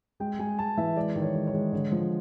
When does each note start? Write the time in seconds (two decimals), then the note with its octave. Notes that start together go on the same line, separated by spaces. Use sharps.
0.20 G#3 G5
0.39 G#3 G#5
0.59 G#3 A5
0.77 E3 E5
0.96 G#3 D5
1.16 D#3
1.22 C#5
1.35 G#3
1.47 C#5
1.54 G#3
1.73 D3 C#5
1.92 F3